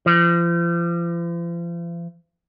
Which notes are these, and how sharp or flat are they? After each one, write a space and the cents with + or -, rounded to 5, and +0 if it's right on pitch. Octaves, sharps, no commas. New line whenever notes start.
F3 -40